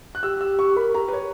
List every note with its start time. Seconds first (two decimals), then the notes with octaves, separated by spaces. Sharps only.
0.15 F#6
0.23 G4 E6
0.41 E6
0.59 C#6
0.76 A#4 B5
0.94 G4 A#5
1.08 B4
1.13 C#5